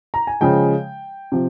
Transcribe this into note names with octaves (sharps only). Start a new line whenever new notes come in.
A#5
G#5
C#3 F3 G#3 G5
C3 F3